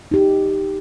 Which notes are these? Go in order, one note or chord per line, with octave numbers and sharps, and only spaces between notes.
D#4 G4